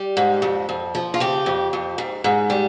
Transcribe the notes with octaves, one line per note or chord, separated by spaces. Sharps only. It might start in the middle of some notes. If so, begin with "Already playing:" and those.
Already playing: G3
G#2
F2
F2
F3
F4
C#3 G4
F2
F2
G#2
G#2
G3